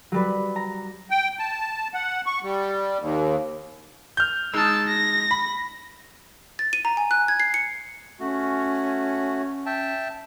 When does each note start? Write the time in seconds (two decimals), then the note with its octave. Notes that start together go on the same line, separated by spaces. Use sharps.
0.12 F#3 G3 B4
0.56 A#5
1.10 G5
1.39 A5
1.94 F#5
2.26 C#6
2.43 G3
3.00 D#2
4.17 F6 G6
4.54 G#3 D#4 A5 E6
4.88 A#6
5.31 B5
6.59 A6
6.73 D#7
6.85 A#5
6.97 G#5
7.11 F#6
7.28 G#6
7.40 C7
7.54 C#7
8.20 A3 C#4 F#4
9.66 E5 G5 A5